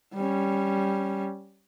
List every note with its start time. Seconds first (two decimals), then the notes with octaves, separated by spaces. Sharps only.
0.14 G3 C#4